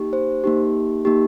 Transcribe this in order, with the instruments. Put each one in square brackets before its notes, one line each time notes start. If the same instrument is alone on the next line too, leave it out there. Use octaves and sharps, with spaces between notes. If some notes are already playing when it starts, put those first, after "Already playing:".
Already playing: [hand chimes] A#3 D#4 G4
C5
A#3 D#4 G4
A#3 D#4 G4